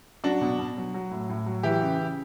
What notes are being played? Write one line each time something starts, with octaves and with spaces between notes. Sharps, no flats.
F#3 D4 F#4
B2
B2
F#3
F#3
A2
A2
F#3
E3 E4 G4
C#3
C#3